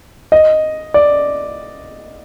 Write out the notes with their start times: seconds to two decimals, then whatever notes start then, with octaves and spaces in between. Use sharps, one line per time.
0.32 D#5
0.94 D5